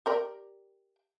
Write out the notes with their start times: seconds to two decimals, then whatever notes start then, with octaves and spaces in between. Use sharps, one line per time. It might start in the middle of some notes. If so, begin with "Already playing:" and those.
0.06 G4 A#4 D5